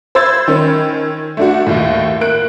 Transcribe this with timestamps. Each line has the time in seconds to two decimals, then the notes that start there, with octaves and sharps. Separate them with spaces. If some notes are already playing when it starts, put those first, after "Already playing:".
0.15 C5 B5 E6 G#6 A6
0.48 D#3 C#4
1.37 A3 D4 F#4
1.67 D#2 A2
2.21 A#3 F#6 D7